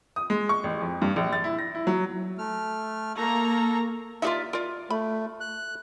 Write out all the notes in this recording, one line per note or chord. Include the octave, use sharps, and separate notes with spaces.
D#6
G#3
C#6
A1
F2
G2
A#1
A6
E4
A#6
E4
F#3
A3 F6
A#3 A4 A#5 C#6
D#4 F4 G4 A#4 D5 E5
F4 A#4 D5
A3 B5
F#6